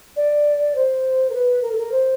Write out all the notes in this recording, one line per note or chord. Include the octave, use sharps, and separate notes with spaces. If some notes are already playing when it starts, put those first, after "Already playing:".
D5
C5
A#4
B4
A#4
A4
A#4
C5